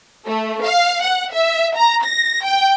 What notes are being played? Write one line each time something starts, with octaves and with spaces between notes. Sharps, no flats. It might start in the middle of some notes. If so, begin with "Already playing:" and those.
A3
F5
F#5
E5
A#5
A#6
G5